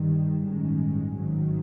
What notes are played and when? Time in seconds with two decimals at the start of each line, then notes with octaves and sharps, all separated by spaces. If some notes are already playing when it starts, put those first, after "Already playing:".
Already playing: G2 D#3 G3
0.44 A1 G2 D#3 G#3 C#4
1.15 G#1 G#2 D#3 F#3